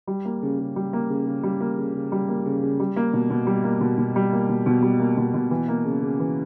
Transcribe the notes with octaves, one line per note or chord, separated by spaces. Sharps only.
G3
A#3
C#3
C#3
G3
A#3
C#3
C#3
G3
A#3
C#3
C#3
G3
A#3
C#3
C#3
G3
A#3
B2
B2
G3
A#3
B2
B2
G3
A#3
B2
B2
G3
A#3
B2
B2
E3
A#3
C#3
C#3
E3